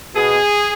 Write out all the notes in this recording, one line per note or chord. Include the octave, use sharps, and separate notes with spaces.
B2 G#4